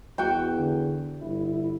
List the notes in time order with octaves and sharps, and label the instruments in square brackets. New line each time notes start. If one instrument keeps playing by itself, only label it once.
[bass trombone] E2 [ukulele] F#4 G5
[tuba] D3
[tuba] G1 [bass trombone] E4